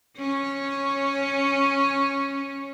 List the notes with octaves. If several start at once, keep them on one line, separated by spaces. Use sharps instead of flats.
C#4 C#5